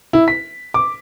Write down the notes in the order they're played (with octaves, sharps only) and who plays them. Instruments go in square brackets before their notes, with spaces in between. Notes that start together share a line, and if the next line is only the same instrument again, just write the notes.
[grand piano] E4
B6
D6